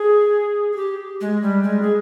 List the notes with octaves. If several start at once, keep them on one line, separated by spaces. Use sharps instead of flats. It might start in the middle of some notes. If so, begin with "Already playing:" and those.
Already playing: G#4
G#4
G4
G#3
G3
G#3
G#4